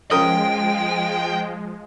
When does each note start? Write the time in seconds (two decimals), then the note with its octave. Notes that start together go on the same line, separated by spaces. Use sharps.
0.11 F3 G#3 C#4 A#4 G5 D#6